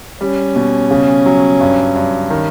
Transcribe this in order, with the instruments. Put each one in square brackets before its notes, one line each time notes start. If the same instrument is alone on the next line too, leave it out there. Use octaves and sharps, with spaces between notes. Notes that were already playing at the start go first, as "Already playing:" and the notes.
[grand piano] G3 [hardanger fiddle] C#4
[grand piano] B2
C#3
F#3
G2
G2
D#3